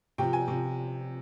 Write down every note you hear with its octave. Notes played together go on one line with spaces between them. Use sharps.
C3 F3 G5
G#5
C3 F3